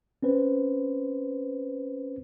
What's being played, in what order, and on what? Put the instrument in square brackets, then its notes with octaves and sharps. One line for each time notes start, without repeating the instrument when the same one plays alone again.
[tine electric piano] C4 C#4 B4 C5